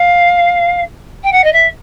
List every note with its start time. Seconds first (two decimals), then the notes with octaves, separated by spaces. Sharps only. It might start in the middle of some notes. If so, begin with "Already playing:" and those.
Already playing: F5
1.23 G5
1.31 F#5
1.44 D#5
1.52 E5